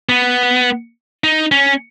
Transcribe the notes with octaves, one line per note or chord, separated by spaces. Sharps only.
B3
D#4
C#4